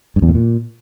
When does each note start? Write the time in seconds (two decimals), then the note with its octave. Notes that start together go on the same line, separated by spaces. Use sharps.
0.16 G2
0.22 E2
0.29 A2
0.35 A#2